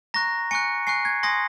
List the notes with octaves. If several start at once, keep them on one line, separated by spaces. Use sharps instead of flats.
A#5 C#6 F#6 A#6
G#5 C#6 F#6 C#7
G#5 C#6 F#6 C7
G#6
G#5 C6 D#6 A#6